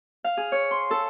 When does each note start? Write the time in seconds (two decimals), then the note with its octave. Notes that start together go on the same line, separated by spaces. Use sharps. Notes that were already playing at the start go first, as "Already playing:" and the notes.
0.24 F5
0.37 G#4
0.52 C#5
0.71 C6
0.91 A4